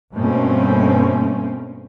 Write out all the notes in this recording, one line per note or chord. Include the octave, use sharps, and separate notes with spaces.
G2 B2 A3 A#3 C4 C#4